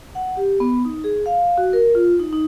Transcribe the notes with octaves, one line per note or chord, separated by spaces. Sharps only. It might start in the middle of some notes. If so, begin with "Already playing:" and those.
F#5
G4
B3
D#4
G#4
F5
F#4
A#4
F4
D#4
D#4